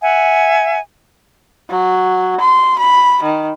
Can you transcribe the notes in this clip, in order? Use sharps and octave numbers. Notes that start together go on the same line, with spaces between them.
E5 F#5 G#5
F#3
C6
B5
D#3